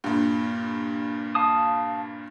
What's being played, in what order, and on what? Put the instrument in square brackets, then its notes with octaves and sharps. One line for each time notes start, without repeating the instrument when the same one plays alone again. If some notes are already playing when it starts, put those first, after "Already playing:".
[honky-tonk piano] G2 A#2
[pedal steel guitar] F5 A5 D#6